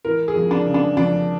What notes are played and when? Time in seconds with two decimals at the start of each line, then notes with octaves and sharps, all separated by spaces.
0.05 E3 A#4
0.28 G#4
0.36 F2
0.51 D4
0.66 C#3
0.74 D4
0.97 F2 D4